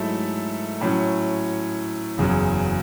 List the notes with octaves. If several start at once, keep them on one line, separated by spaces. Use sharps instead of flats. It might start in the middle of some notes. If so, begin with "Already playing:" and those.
Already playing: G#2 F#3 A3 E4 A4
A2 F#3 C#4
F#1 E2 C#3 F#3